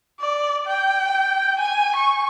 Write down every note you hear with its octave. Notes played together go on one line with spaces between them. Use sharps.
D5
G5
G#5
C#6